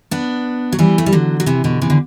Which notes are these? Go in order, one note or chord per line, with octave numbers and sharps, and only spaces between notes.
B3 D4
F#3
E3 G3
A3
G3
D3 F#3
F#3
C3 E3
B2 D3
C3 E3
D3